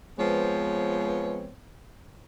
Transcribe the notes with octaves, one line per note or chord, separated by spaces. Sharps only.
F3 G#3 B3 C4 B4 C#5